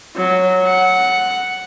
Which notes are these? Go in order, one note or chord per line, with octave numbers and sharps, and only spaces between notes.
F#3
F#5